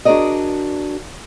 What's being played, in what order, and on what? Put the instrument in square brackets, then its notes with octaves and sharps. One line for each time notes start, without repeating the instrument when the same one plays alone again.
[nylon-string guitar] D4 F#4 G#4 A#4 D5 D#5